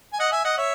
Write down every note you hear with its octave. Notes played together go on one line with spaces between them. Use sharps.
G#5
D#5 F#5
E5 G#5
D#5 F#5
C#5 E5